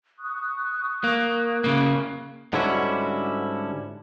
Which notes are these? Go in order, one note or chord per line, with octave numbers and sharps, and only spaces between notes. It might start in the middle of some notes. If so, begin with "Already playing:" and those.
C#6 D#6 F#6
A#3
C#3 A#3
G#2 D3 G3 C#4 E4 F#4